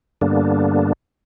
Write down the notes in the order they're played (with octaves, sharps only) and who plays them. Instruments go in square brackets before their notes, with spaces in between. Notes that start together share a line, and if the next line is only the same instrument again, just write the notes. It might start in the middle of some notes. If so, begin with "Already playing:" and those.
[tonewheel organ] G2 D3 G3 A#3 B3 D4